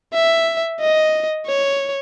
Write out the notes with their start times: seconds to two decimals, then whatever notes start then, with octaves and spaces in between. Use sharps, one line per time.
0.14 E5
0.80 D#5
1.46 C#5